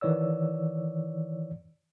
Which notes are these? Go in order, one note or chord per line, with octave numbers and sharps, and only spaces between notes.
D#3 E3 C#5 D5 E6